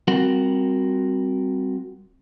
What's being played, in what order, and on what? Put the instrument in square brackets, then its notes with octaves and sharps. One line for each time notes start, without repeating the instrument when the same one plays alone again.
[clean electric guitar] G3 C4 F4 F#4 A#4 F#5